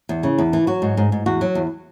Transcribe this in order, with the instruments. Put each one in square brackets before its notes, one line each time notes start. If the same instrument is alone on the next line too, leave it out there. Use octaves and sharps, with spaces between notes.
[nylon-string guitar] E2
C#3
E2
E3
F#3 F#4
G#2
G#2
G#2
E2 F#4
F#3
E2